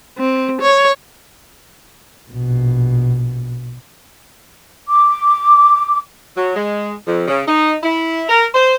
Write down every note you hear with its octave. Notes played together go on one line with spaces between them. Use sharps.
C4
C#5
A#1 B2
D6
F#3
G#3
F2
C#3
D#4
E4
A#4
C5